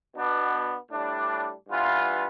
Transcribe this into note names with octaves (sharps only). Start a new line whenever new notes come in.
B2 B3 D4
A2 G3 D4
G2 E3 B3 F4